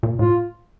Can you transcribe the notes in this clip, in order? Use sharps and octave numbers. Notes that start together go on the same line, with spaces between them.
A#2
A2 F4